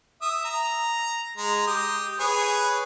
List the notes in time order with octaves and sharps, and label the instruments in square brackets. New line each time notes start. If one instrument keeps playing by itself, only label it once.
[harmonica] E5 D#6
A#5
G#3 A#5
G4 D#6
G#4 B4 C#5